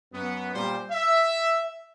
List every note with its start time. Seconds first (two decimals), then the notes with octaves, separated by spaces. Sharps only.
0.13 F#2 B3
0.54 A#2 G3 C5
0.90 E5